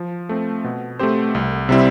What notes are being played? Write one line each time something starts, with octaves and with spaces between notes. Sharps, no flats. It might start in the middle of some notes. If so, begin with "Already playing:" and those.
Already playing: F3
A3 C4
B2
A3 C4 G4 C5
C2
C3 G3 C4 E4